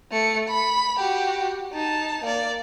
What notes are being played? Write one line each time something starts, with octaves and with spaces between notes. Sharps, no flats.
A3 C#7
B5
F#4 G4
D#4 A5
A#3 D5